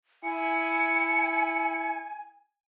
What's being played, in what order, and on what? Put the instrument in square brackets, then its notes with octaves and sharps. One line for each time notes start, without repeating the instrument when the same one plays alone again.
[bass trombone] E4 [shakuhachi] G#5 [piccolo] C#7